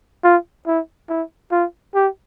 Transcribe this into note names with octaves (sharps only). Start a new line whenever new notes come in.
F4
E4
E4
F4
G4